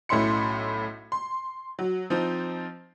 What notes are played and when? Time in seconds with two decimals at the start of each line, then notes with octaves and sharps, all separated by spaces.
0.09 B1 A2 C#4 E4 C6 C#7
1.12 C6
1.79 F#3
2.10 F3 C4 D#4